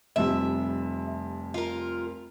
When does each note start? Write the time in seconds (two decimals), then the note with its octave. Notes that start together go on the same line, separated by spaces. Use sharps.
0.16 F1 F2 G3 E5
1.54 F4 A#4